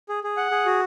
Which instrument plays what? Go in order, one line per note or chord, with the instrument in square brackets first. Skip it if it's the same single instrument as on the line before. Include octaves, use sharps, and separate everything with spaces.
[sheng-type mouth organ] G#4
G#4
F#5
G#4
F#4